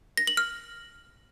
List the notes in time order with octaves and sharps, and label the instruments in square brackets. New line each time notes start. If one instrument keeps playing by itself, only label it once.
[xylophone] A#6
F#7
F6